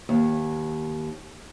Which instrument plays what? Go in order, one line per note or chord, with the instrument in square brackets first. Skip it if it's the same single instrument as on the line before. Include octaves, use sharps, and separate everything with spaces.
[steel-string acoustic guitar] D#2